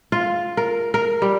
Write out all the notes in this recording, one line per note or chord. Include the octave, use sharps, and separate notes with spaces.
F4
A#4
A#4
G3